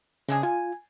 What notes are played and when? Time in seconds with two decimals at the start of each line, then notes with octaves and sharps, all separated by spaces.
0.28 C#3 G#3 D4 G#4
0.43 F4 G#5